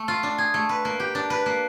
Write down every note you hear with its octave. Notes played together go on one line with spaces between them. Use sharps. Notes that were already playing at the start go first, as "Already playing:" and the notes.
Already playing: A3
F4
D4
G#4
A3
B4
A#3
G4
D4
B4
A#3